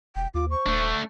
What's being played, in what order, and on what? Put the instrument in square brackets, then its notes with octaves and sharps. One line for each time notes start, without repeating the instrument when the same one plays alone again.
[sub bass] E1 [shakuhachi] G5
[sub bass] D#2 [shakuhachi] F4 [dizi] D6
[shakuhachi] C5 [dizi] C#6
[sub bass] D#1 [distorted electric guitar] A3 D4